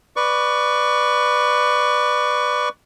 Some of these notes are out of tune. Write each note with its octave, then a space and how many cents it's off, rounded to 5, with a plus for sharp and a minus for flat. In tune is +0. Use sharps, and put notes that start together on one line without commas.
B4 +0 D5 +15 C#6 +25